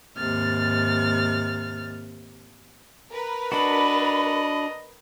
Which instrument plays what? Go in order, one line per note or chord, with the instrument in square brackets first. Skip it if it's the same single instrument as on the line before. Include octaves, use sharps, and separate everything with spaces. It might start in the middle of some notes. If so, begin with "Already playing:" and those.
[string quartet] D#2 G#2 C3 F6 A6
[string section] A#4 B4
[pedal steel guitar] D4 F#4 [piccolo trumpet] D#5 [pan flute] B5